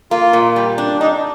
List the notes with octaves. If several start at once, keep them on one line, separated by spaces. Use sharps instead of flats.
A#3 F4
A#2
G3
D4
D4 D#4